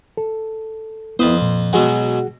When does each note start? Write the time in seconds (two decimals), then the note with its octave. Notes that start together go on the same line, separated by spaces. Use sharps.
0.17 A4
1.19 F2 B3 E4 B4 C5 D#6
1.42 A#2
1.73 B2 F#3 G#3 F#4 G#4 F#5